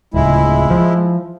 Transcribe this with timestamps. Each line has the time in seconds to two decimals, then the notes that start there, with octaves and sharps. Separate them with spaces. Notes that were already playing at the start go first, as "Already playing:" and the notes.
0.14 D1 C#2 G#3 E4
0.70 F3